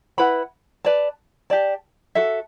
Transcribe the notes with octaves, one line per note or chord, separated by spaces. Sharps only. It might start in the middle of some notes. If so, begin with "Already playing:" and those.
E4 B4 F#5 B5
B4 D5 A5
G4 D5 A5
F#4 A4 E5